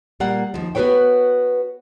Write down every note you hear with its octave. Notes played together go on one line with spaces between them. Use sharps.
A#2 G3 A#3 F#5
D#2 F3
B3 F#4 A4 B4 C#5 G5